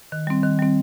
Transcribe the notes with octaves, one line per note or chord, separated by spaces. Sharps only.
D#3
G3 C4
D#3
G3 C4